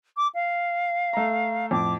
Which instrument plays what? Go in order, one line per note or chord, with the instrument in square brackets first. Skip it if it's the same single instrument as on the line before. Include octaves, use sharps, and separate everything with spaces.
[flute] D6
F5
[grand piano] A3 A#5
[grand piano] F2 A2 [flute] D6